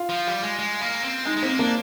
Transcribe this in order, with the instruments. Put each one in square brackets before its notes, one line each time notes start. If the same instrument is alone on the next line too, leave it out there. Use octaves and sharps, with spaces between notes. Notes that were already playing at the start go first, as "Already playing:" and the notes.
Already playing: [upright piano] F4
[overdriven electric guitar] F3
G3
G#3
G#3
A#3
C4
[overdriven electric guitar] G#3 [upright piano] D#4
[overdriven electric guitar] G#3
[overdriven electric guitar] A#3 [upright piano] C4
[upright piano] A#3 [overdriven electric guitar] D4